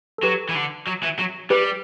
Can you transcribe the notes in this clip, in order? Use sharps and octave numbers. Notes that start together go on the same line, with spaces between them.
A4
F#3 G4 B4
E3
D3
F#3
E3
F#3
G3 G4 B4